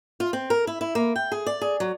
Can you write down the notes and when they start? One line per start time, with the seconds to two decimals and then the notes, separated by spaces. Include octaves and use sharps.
0.20 F4
0.33 C4
0.50 A#4
0.67 E4
0.81 E4
0.95 A#3
1.16 G5
1.32 G#4
1.46 D5
1.61 G#4
1.80 F#3